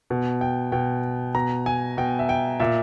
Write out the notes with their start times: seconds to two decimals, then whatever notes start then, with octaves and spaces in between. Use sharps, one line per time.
0.10 B2
0.41 G5
0.72 B2 G5
1.35 B2 A#5
1.66 G#5
1.97 B2 G5
2.19 E5
2.29 G5
2.60 A#2 E5